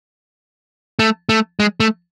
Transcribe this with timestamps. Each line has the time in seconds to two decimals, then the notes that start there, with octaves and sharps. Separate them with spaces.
0.99 A3
1.29 A3
1.60 G#3
1.80 A3